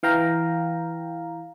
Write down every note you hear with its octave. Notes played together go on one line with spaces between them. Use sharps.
E3 F5 G5 A#5